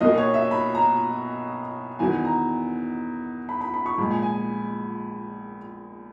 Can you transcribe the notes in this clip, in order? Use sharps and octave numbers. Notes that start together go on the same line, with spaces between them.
B1 B2 A#3 D#5
C#5
E5
B5
A#5
E2 D#3 F#3 B3 G#5
A#5
B5
B5
B5
C#6
A#1 A#2 G#3 B5
G#5
G#5